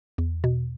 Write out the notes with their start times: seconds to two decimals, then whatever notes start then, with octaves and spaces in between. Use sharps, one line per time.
0.18 E2
0.44 B2